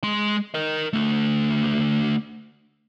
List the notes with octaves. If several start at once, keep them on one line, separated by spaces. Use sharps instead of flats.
G#3 C6
A#4 D#5
D3 A3